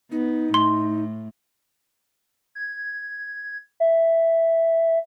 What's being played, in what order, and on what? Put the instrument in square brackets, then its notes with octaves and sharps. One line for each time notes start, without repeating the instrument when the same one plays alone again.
[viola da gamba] B3 [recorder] D#4
[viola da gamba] A2 [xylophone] C6
[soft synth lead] G#6
E5